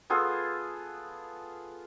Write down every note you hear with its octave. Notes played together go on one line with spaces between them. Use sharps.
B3 F4 G#4 A4